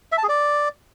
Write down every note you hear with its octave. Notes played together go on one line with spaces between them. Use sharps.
E5
A5
G#4
D5